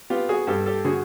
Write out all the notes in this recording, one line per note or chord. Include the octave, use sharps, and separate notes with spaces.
B3 F4 G4
F#4 G#4
G2 G4 A4
G4 A4
D3 F#4 G#4